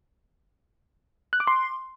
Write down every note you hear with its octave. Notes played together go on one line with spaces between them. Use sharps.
F#6
D6
C6